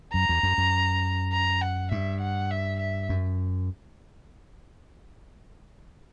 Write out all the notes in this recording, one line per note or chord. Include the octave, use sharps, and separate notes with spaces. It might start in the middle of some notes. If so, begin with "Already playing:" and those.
F#2 A#5
E2
F#2
F#2
A#5
F#5
G2 E5
F#5
E5
E5
F#2